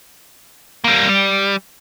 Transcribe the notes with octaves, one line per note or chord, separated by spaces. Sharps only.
G3 A#3
G3